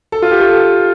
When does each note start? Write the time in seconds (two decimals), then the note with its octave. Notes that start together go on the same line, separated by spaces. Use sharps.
0.12 A4
0.22 F4
0.31 G4
0.40 A4